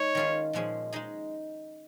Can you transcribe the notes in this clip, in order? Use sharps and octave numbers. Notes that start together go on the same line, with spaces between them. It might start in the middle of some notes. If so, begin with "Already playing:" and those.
Already playing: G#3 D#4 C#5
D#3 C#4 F4 G#4
A#2 F3 G#3 C#4 G#4
G#3 D#4 G#4